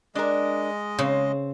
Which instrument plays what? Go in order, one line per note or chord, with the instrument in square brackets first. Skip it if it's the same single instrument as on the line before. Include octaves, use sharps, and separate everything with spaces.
[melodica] G#3 D#5 [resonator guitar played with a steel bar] D4 A#4
[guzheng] C#3 [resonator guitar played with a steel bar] C4